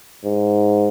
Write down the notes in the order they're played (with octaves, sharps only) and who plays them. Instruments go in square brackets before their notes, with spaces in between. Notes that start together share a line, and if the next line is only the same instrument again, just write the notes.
[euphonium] G#2